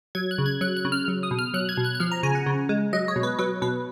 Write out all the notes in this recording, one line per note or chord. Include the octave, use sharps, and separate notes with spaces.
F#3 G#6
F#6
C#3
G#6
F#3 F#6
F#6
C#3
F6
F#3
D#6
B2
F6
F#3 F#6
G#6
B2
F#6
F#6
F3 F6
A#5
C#3 G#5
F#5
C#3
G#3
F#3 D#5
C#5
B2
B4
F#3 B4
B2 B4